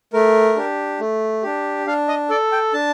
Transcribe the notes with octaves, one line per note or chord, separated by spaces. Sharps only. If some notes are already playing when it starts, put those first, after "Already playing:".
A3 A#4
D4 G4
A3
D4 G4
D4 F5
D#5
A4 D5
G5
D4 A5